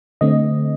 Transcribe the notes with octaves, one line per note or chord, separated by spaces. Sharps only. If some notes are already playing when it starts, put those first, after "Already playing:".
D3 A3 C4 D#5